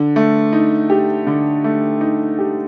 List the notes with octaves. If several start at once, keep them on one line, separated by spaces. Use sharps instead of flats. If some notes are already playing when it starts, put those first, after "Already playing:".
Already playing: D3
A3
D#4
G4
D3
A3
D#4
G4